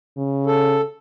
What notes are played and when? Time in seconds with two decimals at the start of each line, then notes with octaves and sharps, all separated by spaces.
0.17 C#3
0.46 A4